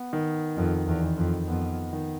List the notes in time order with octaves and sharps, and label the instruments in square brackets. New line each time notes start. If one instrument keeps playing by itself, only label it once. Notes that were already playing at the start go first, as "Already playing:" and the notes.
Already playing: [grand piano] B3
D#3
[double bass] F2 [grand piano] D#3
[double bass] E2
[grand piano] D#3
[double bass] F2
[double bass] F2 [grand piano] B3
[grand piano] D#3